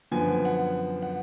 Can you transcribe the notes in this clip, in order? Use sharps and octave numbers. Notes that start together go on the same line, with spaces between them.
F#2 D3 F3 B3 G#5
G#5
F#5
F#5